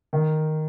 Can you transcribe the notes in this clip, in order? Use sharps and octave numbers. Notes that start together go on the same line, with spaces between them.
D#3